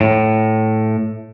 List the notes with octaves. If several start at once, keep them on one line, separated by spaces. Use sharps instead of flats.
A2